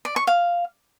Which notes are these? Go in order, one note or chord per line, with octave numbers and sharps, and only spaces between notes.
D5
C#6
F5